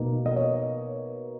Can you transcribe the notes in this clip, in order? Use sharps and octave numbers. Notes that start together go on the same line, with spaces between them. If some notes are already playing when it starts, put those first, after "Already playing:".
Already playing: B2 A#3 D#4
D#5
C#5